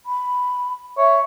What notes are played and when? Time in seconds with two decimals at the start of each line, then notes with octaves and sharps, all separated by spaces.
0.06 B5
0.98 C#5 E5